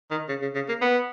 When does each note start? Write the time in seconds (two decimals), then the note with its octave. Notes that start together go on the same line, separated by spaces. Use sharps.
0.11 D#3
0.29 C#3
0.42 C#3
0.55 C#3
0.68 A#3
0.81 B3